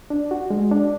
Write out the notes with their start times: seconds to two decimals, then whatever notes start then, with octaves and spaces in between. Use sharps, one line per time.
0.10 D4
0.31 F#4
0.51 G#3
0.71 D4